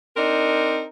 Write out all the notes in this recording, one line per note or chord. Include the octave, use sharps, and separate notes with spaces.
C4 D4 D#4 A#4